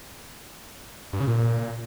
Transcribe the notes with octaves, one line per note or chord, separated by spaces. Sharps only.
G2
C#3
A#2